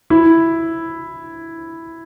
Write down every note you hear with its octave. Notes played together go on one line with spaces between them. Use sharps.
E4